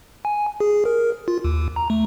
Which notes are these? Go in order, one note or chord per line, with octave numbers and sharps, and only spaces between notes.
G#5
G#4
A#4
F4
D#2
A#5
A3